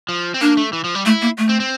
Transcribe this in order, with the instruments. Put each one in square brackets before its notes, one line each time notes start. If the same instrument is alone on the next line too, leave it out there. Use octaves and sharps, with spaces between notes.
[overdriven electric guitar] F3
C4
[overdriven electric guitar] A#3 [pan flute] D4
[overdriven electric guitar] A3
E3
F3
G3
[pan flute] A3 [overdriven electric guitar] E4
[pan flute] A#3
A3
[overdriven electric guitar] C4
C4